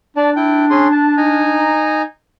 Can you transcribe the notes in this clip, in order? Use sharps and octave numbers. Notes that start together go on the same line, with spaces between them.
D4 D5 A5
E4 G5
C#4 G#4 C6
A5
D#4 G#5 A#5